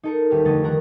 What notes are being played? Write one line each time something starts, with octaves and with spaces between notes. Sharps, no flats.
D#4 A4 A#4
D#1 G3 G4 B4
F2 D3 A3 D#5 A6
D#3 A#4 A#5 F#6